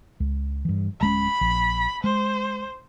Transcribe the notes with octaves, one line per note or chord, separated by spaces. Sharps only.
C#2
G2 E3
D1 G#3 C#4 B5
A#1
G#3 C5